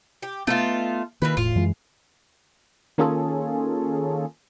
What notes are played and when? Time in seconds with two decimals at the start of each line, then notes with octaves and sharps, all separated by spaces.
0.22 G4
0.47 A3 B3 D#4 F4
1.22 D#3 E3 A#3 F4 B4
1.37 E1 A2 F4
1.56 F#2 E3 G#3
2.98 D#3 A#3 C#4 F4 G#4 A4